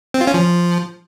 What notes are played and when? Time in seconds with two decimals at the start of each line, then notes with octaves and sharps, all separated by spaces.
0.14 C4
0.21 F4
0.27 C#4
0.34 F3